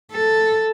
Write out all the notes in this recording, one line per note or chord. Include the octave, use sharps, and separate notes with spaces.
A4